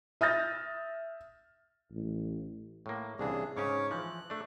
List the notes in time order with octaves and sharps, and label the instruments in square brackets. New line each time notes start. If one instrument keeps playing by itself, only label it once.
[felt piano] E5 D#6 F6 G6 A6 A#6
[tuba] A1
[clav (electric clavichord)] A2 A#3
[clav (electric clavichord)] C2 E3 [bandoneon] C#3 D4 G#4
[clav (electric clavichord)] G#2 C#3 C#4 [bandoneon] C#5 C#6 D6
[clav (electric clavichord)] E3 F3 [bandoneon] F#6
[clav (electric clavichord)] A3 D4